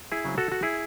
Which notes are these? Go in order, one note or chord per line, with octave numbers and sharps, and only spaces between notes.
E4 G#4
C#3 F#3 C4
F#4 A4
F#4
E4 G#4